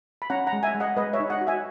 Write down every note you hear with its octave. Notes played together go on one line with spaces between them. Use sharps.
B5
C#4 F#5 A#5
F#5 A#5
G#3
E5 G#5
G#3
D#5 F#5
G#3 B4 D#5
C#5 E5
D#4
D#5 F#5
F#4
E5 G#5